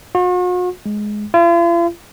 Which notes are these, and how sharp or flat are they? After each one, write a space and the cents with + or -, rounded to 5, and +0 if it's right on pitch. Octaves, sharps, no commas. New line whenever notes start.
F#4 -45
G#3 +10
F4 -45